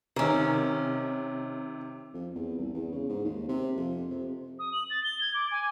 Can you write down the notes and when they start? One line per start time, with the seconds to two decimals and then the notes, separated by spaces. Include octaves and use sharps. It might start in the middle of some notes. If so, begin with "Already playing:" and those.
0.16 C3 D#3 A#3 C#4
2.14 F2
2.35 E2
2.58 C2
2.74 E2
2.92 C#3
3.09 G#2
3.25 D#2
3.48 C3
3.77 F2
4.11 C3
4.59 D#6
4.73 F#7
4.90 A6
5.03 G7
5.21 G#6
5.34 D6
5.51 G#5